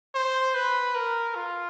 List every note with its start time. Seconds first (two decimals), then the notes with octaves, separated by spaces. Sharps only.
0.14 C5
0.55 B4
0.95 A#4
1.35 F4